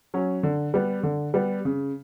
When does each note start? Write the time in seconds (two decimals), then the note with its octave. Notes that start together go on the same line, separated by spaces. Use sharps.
0.14 F#3 C#4
0.43 D3
0.74 G3 B3
1.03 D3
1.34 G3 B3
1.65 C#3